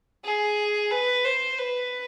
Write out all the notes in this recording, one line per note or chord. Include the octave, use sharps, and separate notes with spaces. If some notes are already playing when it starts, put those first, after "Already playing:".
G#4
B4
C5
B4